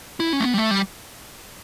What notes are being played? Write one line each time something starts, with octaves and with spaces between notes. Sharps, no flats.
E4
C#4
A3
B3
G3
A3
G3